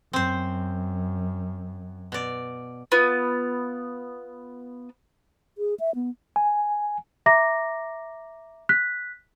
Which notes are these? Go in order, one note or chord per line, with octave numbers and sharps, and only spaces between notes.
F#2 C4 C5
B2 D5
B3 F4
G#4
E5
B3
G#5
E5 A#5 D6 A#6
F#6 B6